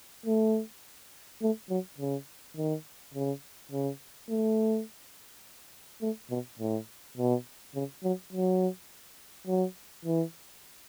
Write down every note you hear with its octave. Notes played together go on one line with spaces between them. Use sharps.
A3
A3
F#3
C#3
D#3
C#3
C#3
A3
A3
B2
A2
B2
C#3
F#3
F#3
F#3
E3